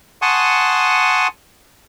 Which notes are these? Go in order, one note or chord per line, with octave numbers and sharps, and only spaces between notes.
F#5 G#5 A5 C6 C#6 D#6